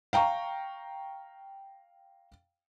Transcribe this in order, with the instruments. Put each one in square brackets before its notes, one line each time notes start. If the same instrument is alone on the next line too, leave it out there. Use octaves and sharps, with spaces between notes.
[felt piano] F5 G5 A#5 C#6